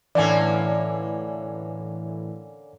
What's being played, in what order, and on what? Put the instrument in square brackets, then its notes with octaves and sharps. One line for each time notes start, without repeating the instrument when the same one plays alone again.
[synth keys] A2 E3 [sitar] D3 A#3 C#4 [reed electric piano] D5 G#5